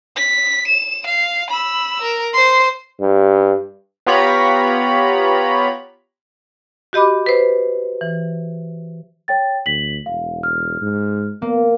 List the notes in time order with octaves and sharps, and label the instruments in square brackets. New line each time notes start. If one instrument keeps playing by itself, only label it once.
[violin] B6
E7
F5
B5 E6
A#4
C5 C6
[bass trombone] G2
[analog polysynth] B3 F4 G4 C#5 A#5 B5
[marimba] F#4 G4 D#5 B5 D6
B4 C5
E3
[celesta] C#5 G5 A6
[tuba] D2 [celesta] B6 F#7
[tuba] E1 [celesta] F5
[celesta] F6
[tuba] G#2
[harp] A#3 [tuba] B3